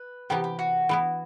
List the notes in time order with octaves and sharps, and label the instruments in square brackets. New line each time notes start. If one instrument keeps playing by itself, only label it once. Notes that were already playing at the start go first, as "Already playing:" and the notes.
Already playing: [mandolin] B4
[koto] C3 E3 B3 [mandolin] G4
[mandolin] G4
F#4
[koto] E3 B3 E4